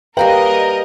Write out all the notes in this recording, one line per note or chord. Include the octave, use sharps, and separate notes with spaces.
G3 A#3 A#4 B4 D#5 F#5 G5 A#5